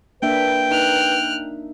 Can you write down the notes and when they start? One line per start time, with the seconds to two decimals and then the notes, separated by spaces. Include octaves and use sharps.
0.22 A#3 D4 B4 E5 G5
0.71 D#4 F6 F#6